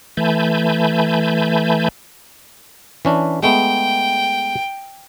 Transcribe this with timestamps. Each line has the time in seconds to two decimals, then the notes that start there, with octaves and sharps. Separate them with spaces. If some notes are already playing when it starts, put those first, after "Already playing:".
0.17 E3 A3 G#5 A5 B5 G6
3.05 E3 C#4 D4
3.43 G#3 A3 B3 G5